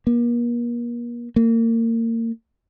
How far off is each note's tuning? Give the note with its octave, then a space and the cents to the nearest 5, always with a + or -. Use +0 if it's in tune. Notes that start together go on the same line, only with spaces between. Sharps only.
A#3 +40
A#3 -30